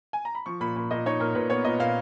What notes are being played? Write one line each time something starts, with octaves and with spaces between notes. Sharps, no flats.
G#5
A#5
B5
F3 C#6
A#2 B5
A#2 B5
A#2 D#5
D#4 C#5
A#2 A#4
A#2 B4
B3 C#5
A#2 D#5
A#2 F5